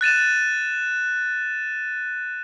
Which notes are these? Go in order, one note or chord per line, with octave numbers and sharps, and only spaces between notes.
F#6 A6 D#7 E7